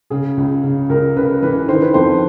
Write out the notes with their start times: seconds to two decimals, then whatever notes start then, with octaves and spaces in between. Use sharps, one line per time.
0.10 C#3 G#4
0.37 C#2
0.64 C#3
0.89 C#2 A#4
1.16 C#3 B4
1.42 E3 B4
1.69 D#3 C5
1.82 B4
1.94 F2 C5